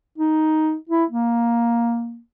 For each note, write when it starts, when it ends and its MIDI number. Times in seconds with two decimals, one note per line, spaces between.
0.18 0.75 63
0.89 1.04 64
1.10 2.19 58